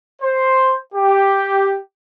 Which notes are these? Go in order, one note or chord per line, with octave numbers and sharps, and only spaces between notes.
C5
G4